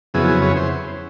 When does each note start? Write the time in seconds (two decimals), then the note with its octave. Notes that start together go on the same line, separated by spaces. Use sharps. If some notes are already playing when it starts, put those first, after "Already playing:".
0.14 F2 C#3 F#3 B3 E4 G#4
0.28 G#4
0.42 C#5
0.56 C5